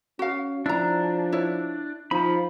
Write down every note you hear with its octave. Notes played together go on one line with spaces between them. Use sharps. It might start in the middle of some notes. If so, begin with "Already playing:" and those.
C#4 F#4 F5
F3 D4 E4 A#5
E4 C#5
F3 D#4 B5